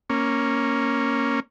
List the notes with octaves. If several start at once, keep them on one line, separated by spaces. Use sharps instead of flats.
A#3 C#4